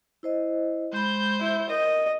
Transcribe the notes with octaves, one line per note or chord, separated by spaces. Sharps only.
E4 C5 D#5
G#3 C5 B5 G6
E4
A#4 D#5